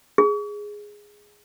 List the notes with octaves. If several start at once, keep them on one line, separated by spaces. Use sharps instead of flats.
G#4